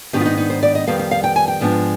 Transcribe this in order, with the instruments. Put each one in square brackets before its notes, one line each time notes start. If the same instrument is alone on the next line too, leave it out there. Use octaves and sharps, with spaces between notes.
[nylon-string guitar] G#2 D#3 B3 D4 G4
F4
D#4
D#4
C5
D5
D#5
F2 D#3 G3 B3 F5
F5
F5
G5
G#5
G5
G#2 F3 G#3 B3 D4